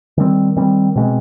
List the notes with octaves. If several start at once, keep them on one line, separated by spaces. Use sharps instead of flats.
D#3 G3 C4
D#3 G3 C4
B2 G#3 C4